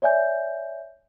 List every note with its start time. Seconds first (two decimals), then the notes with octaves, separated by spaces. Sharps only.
0.02 C#5 D5 E5 G#5 G6